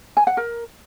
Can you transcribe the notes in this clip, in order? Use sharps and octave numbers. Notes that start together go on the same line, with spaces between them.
G#5
F#5
A#4